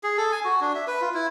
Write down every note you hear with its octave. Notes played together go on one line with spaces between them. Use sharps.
G#4
A4
G#5
F#4
D4
E5
B4
F4
E4